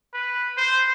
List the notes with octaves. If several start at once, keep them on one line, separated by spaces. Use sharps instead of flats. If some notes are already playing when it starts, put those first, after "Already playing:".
B4
C5